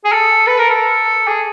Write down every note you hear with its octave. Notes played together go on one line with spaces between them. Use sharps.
G#4
A4
B4
A#4
A4
G#4